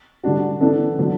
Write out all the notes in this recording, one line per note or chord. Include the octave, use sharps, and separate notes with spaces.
D3 G3 D4 F#4
E3 B3 D4 A4
D3 F#3 B3